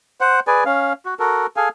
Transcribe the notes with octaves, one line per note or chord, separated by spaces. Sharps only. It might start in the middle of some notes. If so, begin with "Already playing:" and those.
C5 F#5
G#4 B4 D5 G#5
C#4 F5
F#4
F#4 A4 A#4
G#4 A4 F5 G#5